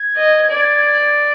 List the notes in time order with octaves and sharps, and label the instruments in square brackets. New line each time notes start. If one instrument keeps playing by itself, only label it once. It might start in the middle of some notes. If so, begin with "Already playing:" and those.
Already playing: [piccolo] G#6
[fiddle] D#5
D5